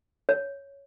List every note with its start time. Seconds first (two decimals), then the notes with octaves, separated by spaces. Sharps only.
0.29 C#5